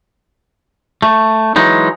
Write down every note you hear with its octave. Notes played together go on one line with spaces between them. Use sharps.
A3
E3 F#3 G#3 D#4